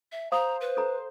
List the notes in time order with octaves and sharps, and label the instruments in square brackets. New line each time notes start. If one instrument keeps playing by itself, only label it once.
[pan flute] E5
[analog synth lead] C5 [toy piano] F5 D#6 [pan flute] A#5
[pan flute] B4
[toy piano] A4 A#5